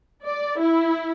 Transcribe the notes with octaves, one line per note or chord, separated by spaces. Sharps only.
D5
E4